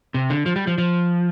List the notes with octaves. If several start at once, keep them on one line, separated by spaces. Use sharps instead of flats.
C3
D3
F3
G3
F3
F3